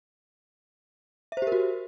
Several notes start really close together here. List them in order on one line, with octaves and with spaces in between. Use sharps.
E5 C5 G4 A#4 F#4